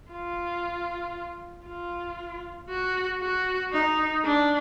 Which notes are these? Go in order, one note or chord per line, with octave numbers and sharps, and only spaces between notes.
F4
F4
F#4
F#4
D#4
D4